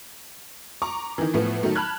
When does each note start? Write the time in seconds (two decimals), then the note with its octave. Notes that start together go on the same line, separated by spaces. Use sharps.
0.82 A#5 C#6 D6
1.18 D#3 E3
1.34 A2 F3 A3 B3
1.63 D#3 F#3 A3
1.75 A5 B5 F6 F#6 G#6